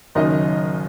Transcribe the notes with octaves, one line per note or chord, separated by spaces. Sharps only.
F#1 F#2 D#3 D#4 D#5